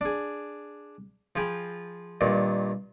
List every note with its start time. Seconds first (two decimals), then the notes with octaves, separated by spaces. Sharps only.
0.01 D4 G#4
1.36 F3 F4 G#4 G5 B5
2.21 G2 A#2 D#3